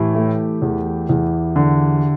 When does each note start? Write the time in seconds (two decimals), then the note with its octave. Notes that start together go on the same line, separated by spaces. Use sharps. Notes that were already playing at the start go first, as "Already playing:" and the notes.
Already playing: A2 E3 E4 G4
0.15 A3
0.62 E2
1.09 E2
1.56 D3